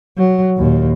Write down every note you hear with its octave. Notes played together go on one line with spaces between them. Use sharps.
F#3
D#2 A#2